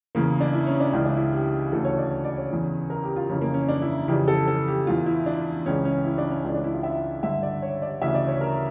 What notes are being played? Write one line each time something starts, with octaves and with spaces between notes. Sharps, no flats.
E2 C#3 E3 A#3
D4
E4
C#4
D4
C#2 C#3 E3 E4
D4
E4
G4
D2 C#3 E3 A4
C#5
D5
D5
C#5
E2 C#3 E3
A#4
G4
F4
F2 C#3 E3 C#4
A#3
C#4
D4
E4
F2 C#3 E3 G4
A4
A4
G4
E2 E3 F4
E4
D4
C#2 C#3 E3 C#4
C#4
E4
D4
C#4
C#2 C#3 E3 C#4
D4
E4
F4
E5
G2 D3 E5
D5
C#5
D5
D2 C#3 E3 E5
D5
C#5
A#4